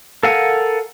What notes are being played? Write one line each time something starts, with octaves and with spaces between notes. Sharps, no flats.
A4 A#4 F5 F#5 G#5